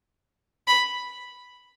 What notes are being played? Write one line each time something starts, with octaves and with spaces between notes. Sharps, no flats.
B5